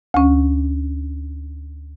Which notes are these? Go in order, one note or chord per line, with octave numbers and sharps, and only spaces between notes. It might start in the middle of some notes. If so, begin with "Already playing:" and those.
D2 C#4